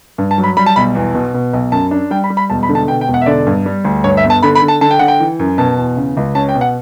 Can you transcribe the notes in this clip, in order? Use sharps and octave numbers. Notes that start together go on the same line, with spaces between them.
G2
A5
F#3
B5
G3 B5
A5
B1 B5
E2
B2
B2
B1
F#2 A5
D4
G3 G5
B5
G3
B5
E1 A5
B5
D3
A5
B2 G5
G5
E1
F#5
E5
D3 D5
G2
G3
D2
G2 C#5
E5
G1
A5
D3 B5
B5
D3
A5
D3 A5
G5
D3 F#5
G5
E3
F#2
B2 A5
E2
C#3
C#2
C#4 A5
G5
B2
F#5